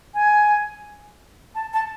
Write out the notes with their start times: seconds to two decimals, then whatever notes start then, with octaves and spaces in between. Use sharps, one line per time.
0.14 G#5
1.55 A5
1.73 A5